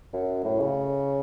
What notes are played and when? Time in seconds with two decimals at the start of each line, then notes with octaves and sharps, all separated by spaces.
0.14 F#2
0.44 A2
0.60 C#3